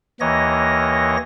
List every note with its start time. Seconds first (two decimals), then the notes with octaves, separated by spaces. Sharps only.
0.21 D#2 E3 A#3 C#5 D#5 A#6